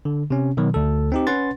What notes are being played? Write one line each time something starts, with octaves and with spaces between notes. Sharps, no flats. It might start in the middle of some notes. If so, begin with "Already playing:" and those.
D3
C3 C#4
B2 D#3 F#3
D2 A4
C4 D#4 G4
C#4 B4 F#5 C6 A6